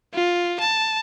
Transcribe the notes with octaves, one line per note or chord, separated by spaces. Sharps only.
F4
A5